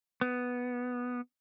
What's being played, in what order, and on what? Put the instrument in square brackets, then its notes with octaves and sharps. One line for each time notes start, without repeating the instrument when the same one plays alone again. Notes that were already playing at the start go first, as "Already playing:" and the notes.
[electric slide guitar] B3